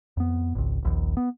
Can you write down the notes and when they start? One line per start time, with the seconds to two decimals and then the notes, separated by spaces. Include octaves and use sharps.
0.17 F2 B3
0.55 G#1 C#2
0.83 D#1 A#1 D#2
1.17 B3